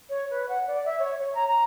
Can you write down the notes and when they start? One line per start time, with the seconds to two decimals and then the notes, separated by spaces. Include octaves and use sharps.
0.09 C#5
0.30 B4
0.48 F#5
0.67 D5
0.85 E5
0.99 C#5
1.21 C#5
1.34 A#5
1.47 A#5